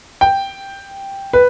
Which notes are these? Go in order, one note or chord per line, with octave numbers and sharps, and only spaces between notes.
G5
B4